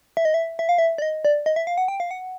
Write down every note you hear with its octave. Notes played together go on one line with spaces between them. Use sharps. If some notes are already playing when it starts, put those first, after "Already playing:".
E5
D#5
E5
E5
F5
E5
D5
D#5
D5
D#5
E5
F5
F#5
G5
F5
F#5